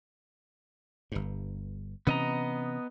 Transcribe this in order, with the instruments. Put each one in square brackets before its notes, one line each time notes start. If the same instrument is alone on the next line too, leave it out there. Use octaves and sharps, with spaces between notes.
[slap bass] G1 G2
[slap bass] C3 E3 C#4 [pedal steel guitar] B3 D#5 A#5